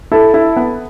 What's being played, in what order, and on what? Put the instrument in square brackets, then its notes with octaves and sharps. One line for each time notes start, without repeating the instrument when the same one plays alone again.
[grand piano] E4 [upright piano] A4
[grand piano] E4
B3